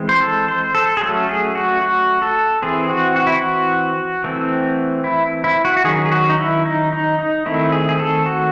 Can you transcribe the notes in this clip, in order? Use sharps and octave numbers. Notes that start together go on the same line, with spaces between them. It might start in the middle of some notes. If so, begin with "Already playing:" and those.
Already playing: E3 G#3 C4
C5
A4
C5
A4
G#4
F#3 A3 C#4 A4
G#4
F#4
F#4
A4
E3 C4 G#4
F#4
F#4
E4
F#4
E3 A3 C4
E4
E4
F#4
F#4
D#3 F#3 C#4 G#4
G#4
F#4
D#4
E4
D#4
D#4
D#4
D#3 A3 C4 E4
G#4
G#4
A4
F#4